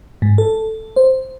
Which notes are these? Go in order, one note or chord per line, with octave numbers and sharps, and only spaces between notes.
G#2
A4
C5